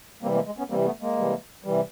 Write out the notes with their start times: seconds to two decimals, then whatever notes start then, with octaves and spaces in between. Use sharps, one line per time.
0.22 C3 E3 G3 A#3 C4
0.34 G#3 A#3
0.46 G#3
0.58 B3 C#4
0.70 C3 E3 G3 A#3 C4
0.85 A3 B3
1.01 G#3 A#3
1.17 C3 E3 G3
1.64 C3 E3 G3